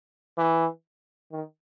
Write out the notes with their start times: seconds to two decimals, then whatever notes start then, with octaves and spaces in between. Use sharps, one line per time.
0.38 E3
1.32 D#3